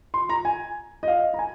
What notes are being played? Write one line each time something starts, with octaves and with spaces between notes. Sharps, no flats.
C6
A#5
G#5
D#5
F5
A#5
G#5